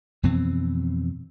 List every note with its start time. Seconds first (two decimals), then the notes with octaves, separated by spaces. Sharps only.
0.23 F2 B2 E3 C4